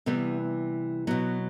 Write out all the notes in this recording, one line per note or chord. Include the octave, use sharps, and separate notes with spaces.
C3 E3 G3 B3
B2 F#3 B3